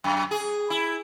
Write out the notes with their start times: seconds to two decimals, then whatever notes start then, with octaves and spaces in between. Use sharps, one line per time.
0.04 F#2
0.31 G#4
0.70 E4